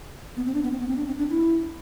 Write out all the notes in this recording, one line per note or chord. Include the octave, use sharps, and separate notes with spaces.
B3
C4
D4
B3
C4
B3
C4
D4
C4
D4
E4